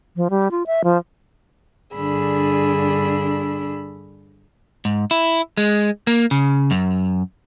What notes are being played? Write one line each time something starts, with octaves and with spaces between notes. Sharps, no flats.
F3
G3
F4
E5
F3
G2 D3 D4 G#4 B5 E6
G#2
E4
G#3
A#3
C#3
F#2